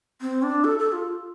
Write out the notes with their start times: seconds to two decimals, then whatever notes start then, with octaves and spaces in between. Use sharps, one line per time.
0.21 C4
0.43 D4
0.64 A4
0.79 A4
0.92 F4